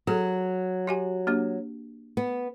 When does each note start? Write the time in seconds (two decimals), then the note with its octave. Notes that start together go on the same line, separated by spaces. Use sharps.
0.07 F#3 G#4 A4
0.87 F#4 G4 G#5
1.27 A#3 D4 G4
2.17 B3